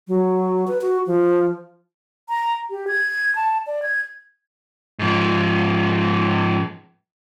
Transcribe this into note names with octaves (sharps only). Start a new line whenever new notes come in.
F#3
B4
F#4
F3
A#5
G4
G#6
A5
D5
G#6
G#2 F3